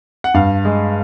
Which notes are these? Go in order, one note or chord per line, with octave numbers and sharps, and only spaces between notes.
F#5
G2 F5
G#3